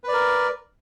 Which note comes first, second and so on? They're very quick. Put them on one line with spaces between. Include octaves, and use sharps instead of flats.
B4 D5 A#4